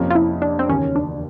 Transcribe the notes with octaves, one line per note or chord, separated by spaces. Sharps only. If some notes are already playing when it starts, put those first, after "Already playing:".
Already playing: F2 C3 F3 A#3 C#4
F4
E4
D4
C4
E1 D#2 C#3 C#4
D4